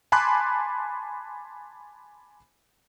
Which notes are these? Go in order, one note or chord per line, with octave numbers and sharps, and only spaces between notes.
G#5 A5 B5 C6 D6 F#6